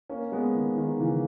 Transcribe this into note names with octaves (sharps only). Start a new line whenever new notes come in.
A#3 C#4
G#3 B3
D#3
D#3
C#3 E3